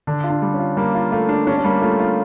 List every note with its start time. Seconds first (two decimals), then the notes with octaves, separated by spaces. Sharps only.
0.07 D3 D4
0.24 F4
0.30 D4
0.42 G3
0.54 C#4
0.59 F4
0.77 G3 A#3
0.95 F4
1.12 A3 F4
1.29 D4
1.47 C#4 D4
1.58 C#4
1.64 G3 A#3
1.82 A3 F4
1.99 F4